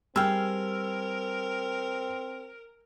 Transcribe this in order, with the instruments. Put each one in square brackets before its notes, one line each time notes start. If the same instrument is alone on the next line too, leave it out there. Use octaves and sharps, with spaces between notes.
[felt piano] G3 E6 F6 [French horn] C4 [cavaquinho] G#4 G5 [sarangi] A#4